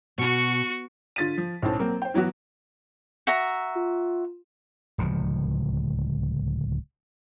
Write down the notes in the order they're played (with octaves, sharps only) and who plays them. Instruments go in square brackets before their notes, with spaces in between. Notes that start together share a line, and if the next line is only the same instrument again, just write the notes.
[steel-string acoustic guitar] B2 [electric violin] F#4 C#6
[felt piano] D3 F4 A6 B6 D#7
F3
B1 A2 C#4 C5 A5
F#3 A#3 C4
C5 G5
E3 F#3 B3 F#4
[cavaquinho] F#4 E5 A#5
[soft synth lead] F4
[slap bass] D1 C#2 C3 F3